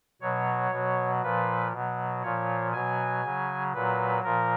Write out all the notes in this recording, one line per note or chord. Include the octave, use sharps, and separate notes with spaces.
B2 F#3 C#5
B2 F#3
A#2 F3 B4
B2 F#3
A#2 F3 C#5
B2 F#3 G#5
C#3 F#3
A#2 F#3 B4
A#2 F3 A#4